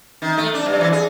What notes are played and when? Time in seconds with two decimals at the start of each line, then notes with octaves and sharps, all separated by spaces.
0.22 D#3
0.37 A3
0.54 D4
0.66 G2
0.79 D3 E3 F3
0.92 G#4